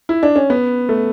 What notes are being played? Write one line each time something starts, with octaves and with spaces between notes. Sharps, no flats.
E4
D4
C#4
B3
A3